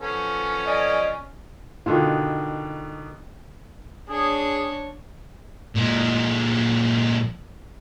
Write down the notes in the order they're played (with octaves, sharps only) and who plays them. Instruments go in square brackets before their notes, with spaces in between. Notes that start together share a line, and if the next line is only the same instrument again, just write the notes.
[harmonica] F3 B3 A4 [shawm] C#4
[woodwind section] D5 D#5 G#5
[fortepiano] B2 D3 D#3 [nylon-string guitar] F4
[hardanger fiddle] D4 C#5 [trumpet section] G#4
[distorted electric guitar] A#2 G#3